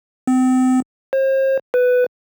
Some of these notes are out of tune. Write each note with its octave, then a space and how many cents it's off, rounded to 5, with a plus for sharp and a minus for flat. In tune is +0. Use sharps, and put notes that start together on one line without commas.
C4 -35
C5 +40
B4 +10